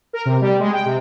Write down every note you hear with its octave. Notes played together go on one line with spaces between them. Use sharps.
A#4
C3
G3
G#3
G5
C3